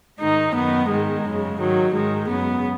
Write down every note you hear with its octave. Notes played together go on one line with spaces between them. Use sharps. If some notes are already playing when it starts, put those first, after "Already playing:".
G#2 D#3 D#4
F#2 D#3 B3
G#2 D#3 G#3
F#2 C#3
G#2 D#3 F#3
G#2 D#3 G#3
F#2 C#3 B3